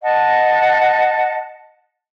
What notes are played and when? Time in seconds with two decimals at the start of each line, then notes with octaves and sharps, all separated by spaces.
0.01 D#5 F#5 A5